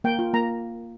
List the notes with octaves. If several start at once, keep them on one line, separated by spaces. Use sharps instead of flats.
A#3 G5
F4
A#3 A#5